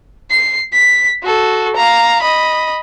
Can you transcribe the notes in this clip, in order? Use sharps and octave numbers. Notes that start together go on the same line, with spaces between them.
C7
B6
F#4 A4
F5 A#5
D#5 B5